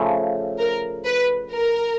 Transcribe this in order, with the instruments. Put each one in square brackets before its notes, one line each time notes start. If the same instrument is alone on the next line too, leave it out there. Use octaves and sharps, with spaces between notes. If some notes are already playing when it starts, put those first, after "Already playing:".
Already playing: [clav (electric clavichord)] C#3 F3 A3
[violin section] A#4
B4
A#4